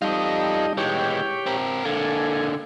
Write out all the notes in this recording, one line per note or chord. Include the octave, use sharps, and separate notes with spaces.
G3 D#4 F4 A4 D#5
E3 G#3 G4 C#5 G5
C4 A#4
D3 A#3 A4 G#5